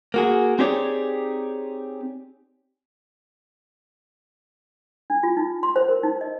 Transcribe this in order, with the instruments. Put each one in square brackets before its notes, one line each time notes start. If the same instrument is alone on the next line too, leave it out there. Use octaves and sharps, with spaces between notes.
[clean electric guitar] A#3 F#4 G#4
C4 D#4 G4 G#4 C#5 D5
[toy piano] D4
F4
D#4
C6
C5
A#4
D#4
D#5